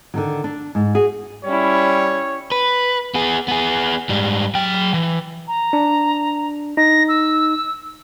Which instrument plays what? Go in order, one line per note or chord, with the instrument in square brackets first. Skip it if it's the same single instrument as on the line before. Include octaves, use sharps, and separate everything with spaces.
[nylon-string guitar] D3 D#3 F#3
D4
G#2
F#4 G#4
[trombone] G3 [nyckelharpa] C#4 E4 [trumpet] C#5
[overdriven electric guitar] B4
B3 G#4
B3 G#4
G#2 G3
F#3 G5
E3
[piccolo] A#5
[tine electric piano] D4
[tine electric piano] D#4 [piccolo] A#6
[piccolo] E6